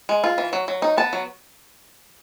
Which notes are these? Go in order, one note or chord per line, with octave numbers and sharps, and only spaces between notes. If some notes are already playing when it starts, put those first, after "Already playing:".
G#3
F4
E3
F#3
F#3
D#4
B3 A5
F#3